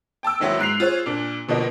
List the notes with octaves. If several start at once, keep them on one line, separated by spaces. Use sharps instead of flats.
G5 A5 D6 E6
G#1 D#3 F#3 E4
G#2 F#6 C7 F7
F4 G#4 C5 C#5
A#2 D4
G1 B2 F3 A#3 D#4